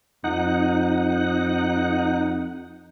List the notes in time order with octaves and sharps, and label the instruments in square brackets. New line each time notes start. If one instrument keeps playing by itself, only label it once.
[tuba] F2 [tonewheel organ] D#4 F#5